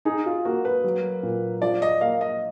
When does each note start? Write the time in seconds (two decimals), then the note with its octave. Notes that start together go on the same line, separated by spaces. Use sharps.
0.05 D#4 G#4
0.26 F4
0.45 A#3 F#4
0.65 B4
0.84 F#3
1.23 A#2
1.62 F3 D5
1.82 D#5
2.01 A#3 F5
2.21 D#5